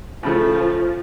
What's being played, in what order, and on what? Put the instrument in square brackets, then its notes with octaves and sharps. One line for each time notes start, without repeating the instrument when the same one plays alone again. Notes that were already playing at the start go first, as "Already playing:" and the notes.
[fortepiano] A2 C#3 A3 [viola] F3 F4